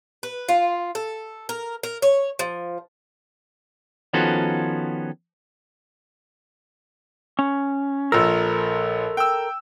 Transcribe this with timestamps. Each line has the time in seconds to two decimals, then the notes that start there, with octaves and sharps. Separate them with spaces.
0.23 B4
0.49 F4
0.95 A4
1.49 A#4
1.83 A#4
2.02 C#5
2.39 F3
4.13 D#3 F3 B3 C#4 F#4 A4
7.39 C#4
8.12 A#1 F3 A4 A#4 E6
9.17 G5 E6